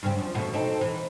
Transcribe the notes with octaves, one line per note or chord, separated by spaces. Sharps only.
G2 C#3 C4
F#2 F3
E2 B2 A3
C4 D#4 A4
E3